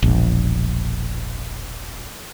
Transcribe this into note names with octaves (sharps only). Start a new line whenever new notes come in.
E1 A#1